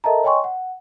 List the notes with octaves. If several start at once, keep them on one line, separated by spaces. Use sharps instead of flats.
A4 A#4 D#5 E5 A5 A#5
C#5 D#5 G5 G#5 C6 C#6
F#5